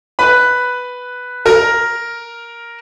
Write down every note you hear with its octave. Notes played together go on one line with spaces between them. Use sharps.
B4 B5
A#4 A#5